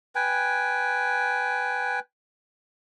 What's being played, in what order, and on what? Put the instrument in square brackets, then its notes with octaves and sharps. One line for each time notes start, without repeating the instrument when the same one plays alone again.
[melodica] B4 G5 G#5